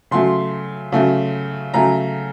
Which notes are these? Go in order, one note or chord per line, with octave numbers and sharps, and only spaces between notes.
C#3 F#3 A3 C6
C#3 F#3 A3
C#3 F#3 A3 A#5